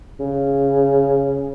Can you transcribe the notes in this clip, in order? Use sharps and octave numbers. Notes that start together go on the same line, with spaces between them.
C#3